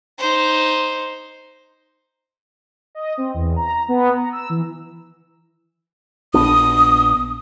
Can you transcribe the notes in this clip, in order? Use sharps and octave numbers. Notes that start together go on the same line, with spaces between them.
D#4 C5
D#5
C4
E2
A#5
A#5
B3
A#5
E6
E3
A#1 B3 D4 D#6